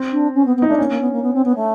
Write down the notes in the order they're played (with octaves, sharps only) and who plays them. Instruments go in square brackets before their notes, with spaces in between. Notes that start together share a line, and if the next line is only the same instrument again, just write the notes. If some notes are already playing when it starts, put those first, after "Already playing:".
Already playing: [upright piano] C4
[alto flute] D4
C#4
B3
B3
[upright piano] D#4
[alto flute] A3
[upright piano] D4
[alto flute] A#3 [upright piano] C#4
[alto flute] A#3
B3
A#3
B3
C4
B3
A3